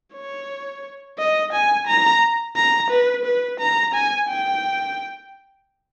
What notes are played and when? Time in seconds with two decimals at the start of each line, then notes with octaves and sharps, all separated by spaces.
0.14 C#5
1.19 D#5
1.53 G#5
1.87 A#5
2.56 A#5
2.90 B4
3.25 B4
3.60 A#5
3.94 G#5
4.28 G5